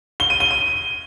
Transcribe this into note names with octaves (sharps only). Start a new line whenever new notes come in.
G7
D#7
G7
D#7